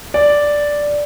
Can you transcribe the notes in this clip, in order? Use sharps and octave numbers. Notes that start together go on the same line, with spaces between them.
D5